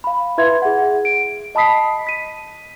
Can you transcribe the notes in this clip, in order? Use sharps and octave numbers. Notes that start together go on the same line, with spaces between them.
F5 B5
E4 B4 E5 C6 G#6
G#4 F#5
D7
D#5 A5 B5 D#6 B6 C7
B6 D#7